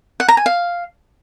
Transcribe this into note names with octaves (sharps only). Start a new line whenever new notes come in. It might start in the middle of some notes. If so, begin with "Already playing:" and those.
F#5
A#5
G#5
F5